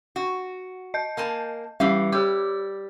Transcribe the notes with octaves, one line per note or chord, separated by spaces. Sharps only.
F#4
D#5 G6
A#3 G#5 A5
E3 G3 G4 F5
G3 G4 D6